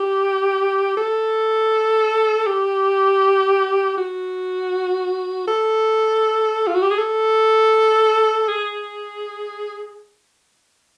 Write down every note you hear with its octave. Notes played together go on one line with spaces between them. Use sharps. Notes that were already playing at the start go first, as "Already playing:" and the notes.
Already playing: G4
A4
G4
F#4
A4
F4
F#4
G4
G#4
A4
G#4